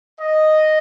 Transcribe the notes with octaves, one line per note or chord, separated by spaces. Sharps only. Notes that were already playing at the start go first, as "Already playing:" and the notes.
D#5